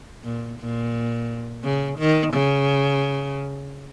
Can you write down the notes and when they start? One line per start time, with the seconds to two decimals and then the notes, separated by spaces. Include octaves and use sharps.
0.25 A#2
0.60 A#2
1.64 C#3
1.99 D#3
2.34 C#3